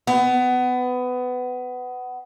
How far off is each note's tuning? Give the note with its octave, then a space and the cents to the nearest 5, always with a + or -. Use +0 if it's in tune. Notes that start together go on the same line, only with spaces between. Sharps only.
B3 +20